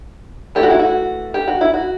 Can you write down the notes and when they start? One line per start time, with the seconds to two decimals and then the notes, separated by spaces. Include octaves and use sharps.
0.55 E3 A3 E4 G4
0.63 F#4
0.71 E4
0.79 F#4
1.34 G4
1.48 F#4
1.61 E4
1.74 F#4